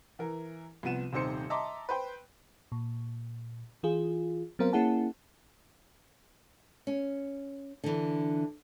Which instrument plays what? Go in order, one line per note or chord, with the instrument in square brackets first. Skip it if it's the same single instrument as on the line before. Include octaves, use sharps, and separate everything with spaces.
[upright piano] E3 A#4
C2 F3 B3 D#7 E7
D#1 C3 D#4 C5 C#7
D#5 E5 A5 A#5 C6 D6
B4 C5 G5
[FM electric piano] A#2
E3 F4 G#4
F#3 B3 C4 A#4 C5 F5
A#3 C#4 E4 G#4 F#5 A5
[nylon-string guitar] C#4
D3 E3